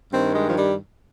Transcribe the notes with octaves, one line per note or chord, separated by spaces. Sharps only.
G2 D#3 C4
G#3
F3
G3